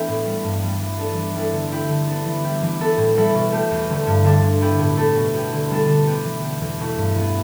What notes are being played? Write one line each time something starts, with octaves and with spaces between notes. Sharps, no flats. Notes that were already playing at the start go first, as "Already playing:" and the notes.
Already playing: E3 A3 B3 D4 E4 G4
A2
G3 B3
G2
G3 B3
E3
B3 D4 A4
E3
G3 E4 A4
D3
A3 E4 G4
D3
B3 D4
E3
G3 E4 G4
E3
B3 E4 A4
A2
E3 G3 E4 A4
B2
A3 G4
E2
D3 A3
G2
D3 G3 D4 A4
D3
B3 E4 G4
A2
A3 E4 A4
B2
B3 G4
D3
G3 B3 D4 A4
D3
B3 G4
E3
B3 G4
E2
B2 A3 E4
G2
E3 B3